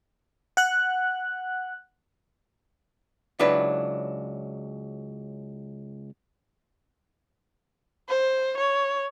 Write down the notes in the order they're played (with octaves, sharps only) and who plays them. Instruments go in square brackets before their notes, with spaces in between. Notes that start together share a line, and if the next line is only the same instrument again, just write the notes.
[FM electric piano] F#5 F#6
[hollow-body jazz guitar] C#2 F#3 D4 E4 B4
[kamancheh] C5
C#5